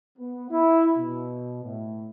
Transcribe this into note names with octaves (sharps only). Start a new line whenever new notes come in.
B3
E4
B2
A2